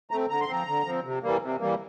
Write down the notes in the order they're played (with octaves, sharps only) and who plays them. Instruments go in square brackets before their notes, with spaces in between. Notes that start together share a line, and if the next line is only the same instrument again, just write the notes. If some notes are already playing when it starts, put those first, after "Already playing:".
[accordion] A3 C4 A#5
D3 A#5
C6
F3 C4 A#5
D3
F3 C4
C3
E3 G3 A#3
C3
E3 G3 A#3